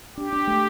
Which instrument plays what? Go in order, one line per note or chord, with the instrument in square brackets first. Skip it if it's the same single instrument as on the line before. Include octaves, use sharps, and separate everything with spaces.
[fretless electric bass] D4 [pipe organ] G4
[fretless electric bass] D4
A3